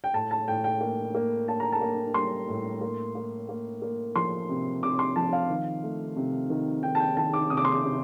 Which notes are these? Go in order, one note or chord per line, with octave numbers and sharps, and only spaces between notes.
G5
A2 A5
A5
A2 G5
G5
A#3
A#3
A#3 A5
A#5
A5
A#3
G3 C6
A2
A#3
A#3
A#3
A#3
F3 C6
C3
C3 D6
C6
F3 A5
F5
D#3
A3
C3
D#3
D#3 G5
A5
G5
D#3 A5
D6
C3 D#6
D6
C6
D6
C3